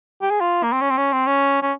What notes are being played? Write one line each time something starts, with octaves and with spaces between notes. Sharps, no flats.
G4
G#4
F4
A#3
C4
C#4
C4
C#4
C4
C#4
C#4